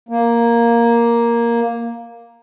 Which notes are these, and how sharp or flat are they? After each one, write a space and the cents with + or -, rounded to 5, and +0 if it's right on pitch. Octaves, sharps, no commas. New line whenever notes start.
A#3 +5